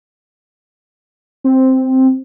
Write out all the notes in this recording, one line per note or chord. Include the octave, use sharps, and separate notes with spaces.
C4